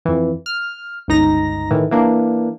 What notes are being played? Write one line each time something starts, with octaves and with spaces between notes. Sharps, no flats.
F2 E3
F6
G1 C#2 D#4 A#5 A#6
A2 D#3 E3
E3 A#3 D4